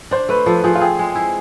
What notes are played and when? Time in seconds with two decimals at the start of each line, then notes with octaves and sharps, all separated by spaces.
0.11 D4 C5
0.29 A3 B4
0.46 F3 A4
0.64 F3 G#4
0.75 F4
0.81 C4 G#4
0.99 G#3
1.15 E4